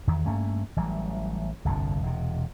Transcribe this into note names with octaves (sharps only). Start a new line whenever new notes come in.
E2 D#3
G2 A3 A#3 C#4
A1 E3 F#3 G3
G1 C2 F2 D3
E1 C3